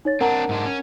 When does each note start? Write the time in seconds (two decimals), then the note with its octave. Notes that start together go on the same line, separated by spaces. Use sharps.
0.05 D#4 C#5 A6
0.21 C4 D4 A#4 F#5 A#5
0.49 G#2 G#3 D4
0.66 C#4